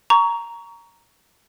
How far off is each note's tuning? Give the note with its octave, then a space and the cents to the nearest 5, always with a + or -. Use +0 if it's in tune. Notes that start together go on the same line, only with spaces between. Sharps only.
A#5 +0 C#6 +25